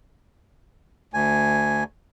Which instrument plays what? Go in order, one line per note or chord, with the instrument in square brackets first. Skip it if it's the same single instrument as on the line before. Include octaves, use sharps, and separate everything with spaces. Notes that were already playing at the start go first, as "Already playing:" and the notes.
[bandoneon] D2 G#5